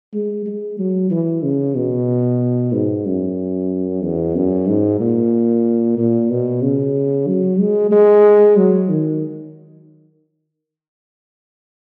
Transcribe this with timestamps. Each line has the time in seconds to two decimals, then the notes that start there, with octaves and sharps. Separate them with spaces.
0.14 G#3
0.46 G#3
0.79 F#3
1.11 E3
1.43 C#3
1.76 B2
2.73 G#2
3.06 F#2
4.02 E2
4.35 F#2
4.67 G#2
5.00 A#2
5.98 A#2
6.30 B2
6.62 C#3
7.27 F#3
7.59 G#3
7.91 G#3
8.57 F#3
8.89 D#3